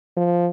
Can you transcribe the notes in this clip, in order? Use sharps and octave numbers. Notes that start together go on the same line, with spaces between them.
F3